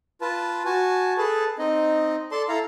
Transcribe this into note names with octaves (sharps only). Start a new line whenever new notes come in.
F4 B4 A5
F#4 G#5 A5
G#4 A4 B4 A5
C4 D#4 D#5
A4 D5 A5 C6
E4 A4 F5 A#5